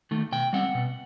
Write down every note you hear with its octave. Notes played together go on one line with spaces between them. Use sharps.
D#3 A3
B2 G5
G3 C4 F#5
B2